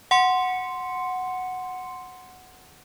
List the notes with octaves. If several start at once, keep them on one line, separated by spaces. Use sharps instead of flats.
F#5 C6 C#7